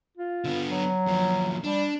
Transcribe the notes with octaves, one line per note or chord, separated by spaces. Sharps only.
F4
D3 B3
F#3
D#2 F3
G3 D4